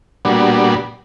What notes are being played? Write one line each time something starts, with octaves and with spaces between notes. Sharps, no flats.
A#2 G3 B3 D4 F#4